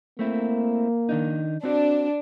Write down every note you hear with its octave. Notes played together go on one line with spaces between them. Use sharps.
A3 A#3 C4 E4
D#3 D4 D#4
C4 D4 F#4